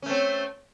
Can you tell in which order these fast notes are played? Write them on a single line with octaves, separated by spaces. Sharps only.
C#4 A3 C4